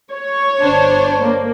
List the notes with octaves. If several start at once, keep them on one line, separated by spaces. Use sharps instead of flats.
C#5
G1 D4 C5
A#3